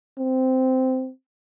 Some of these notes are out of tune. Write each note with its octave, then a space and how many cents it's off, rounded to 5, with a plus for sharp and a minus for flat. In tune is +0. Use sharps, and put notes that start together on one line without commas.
C4 -10